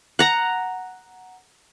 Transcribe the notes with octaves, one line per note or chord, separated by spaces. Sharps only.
F#5 A#5